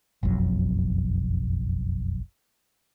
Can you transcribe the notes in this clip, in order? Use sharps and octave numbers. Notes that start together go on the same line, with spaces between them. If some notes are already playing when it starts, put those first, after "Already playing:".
F#1 B1 F2 F#3